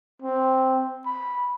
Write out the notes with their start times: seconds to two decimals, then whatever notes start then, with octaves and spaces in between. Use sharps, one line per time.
0.22 C4
1.06 B5